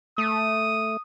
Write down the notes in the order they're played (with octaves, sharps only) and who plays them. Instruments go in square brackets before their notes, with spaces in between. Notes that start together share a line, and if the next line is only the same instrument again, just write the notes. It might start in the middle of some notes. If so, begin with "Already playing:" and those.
[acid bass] A3 [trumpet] D#6